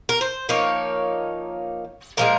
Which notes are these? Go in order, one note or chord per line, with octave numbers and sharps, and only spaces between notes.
A#4
C5
F3 A#3 D#4 C#5
A#2 F3 G#3 A#4